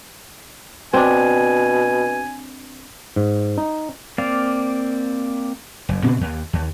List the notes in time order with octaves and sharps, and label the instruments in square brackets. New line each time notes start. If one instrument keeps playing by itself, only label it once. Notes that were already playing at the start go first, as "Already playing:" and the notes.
[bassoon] B2 [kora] C4 D4 [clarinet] G#5
[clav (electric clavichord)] G#2
D#4
[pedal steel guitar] A#3 C4 D5 F5
[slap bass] F#1
A#2 C#3 B3 C4
D#2
D#2